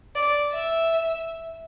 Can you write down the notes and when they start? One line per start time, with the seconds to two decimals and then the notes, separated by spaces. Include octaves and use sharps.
0.15 D5
0.52 E5